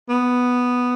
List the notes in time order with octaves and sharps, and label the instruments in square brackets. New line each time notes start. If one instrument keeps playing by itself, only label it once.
[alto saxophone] B3